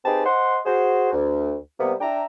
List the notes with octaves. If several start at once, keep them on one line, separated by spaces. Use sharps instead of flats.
C4 D#4 G4 G#4 B4 A5
C5 D#5 F#5 C6
F#4 G#4 C5
D2
C3 G3 A#3 B3
D4 E5 G5 A#5